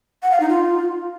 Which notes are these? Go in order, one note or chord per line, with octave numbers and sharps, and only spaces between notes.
F#5
F5
D#4
F4